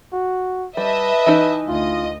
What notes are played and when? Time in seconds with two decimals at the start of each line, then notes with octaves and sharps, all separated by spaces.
0.13 F#4
0.77 G3 B4 D#5 E5 A5
1.26 E3 D#4
1.68 D2 F4 D#5